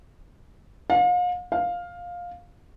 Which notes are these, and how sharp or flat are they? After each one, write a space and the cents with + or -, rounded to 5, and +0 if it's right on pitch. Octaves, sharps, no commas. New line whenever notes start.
F5 +40
F5 +10